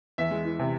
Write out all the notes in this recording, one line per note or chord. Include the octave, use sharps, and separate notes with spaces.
E2 E5
G#3
E3
C3